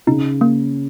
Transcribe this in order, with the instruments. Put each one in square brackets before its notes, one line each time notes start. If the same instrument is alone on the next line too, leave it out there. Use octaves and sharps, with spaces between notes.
[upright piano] C#3 [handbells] D#4
[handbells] A#3